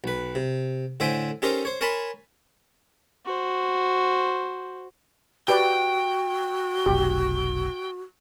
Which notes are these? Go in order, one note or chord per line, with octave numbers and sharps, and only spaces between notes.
B1 B4
C3
A2 D3 C5 E5 G5 G#5
C#4 D#4 G4 A4 A#4 C5
C5 C#5
A#4 C#5 G#5 A5 B5 C6
F#4 C5
F#4 G4 B4 D5 G5
F1 B1 G4